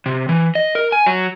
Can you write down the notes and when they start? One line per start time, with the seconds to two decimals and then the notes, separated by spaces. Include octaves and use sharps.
0.06 C3
0.29 E3
0.55 D#5
0.75 A#4
0.92 G#5
1.06 F#3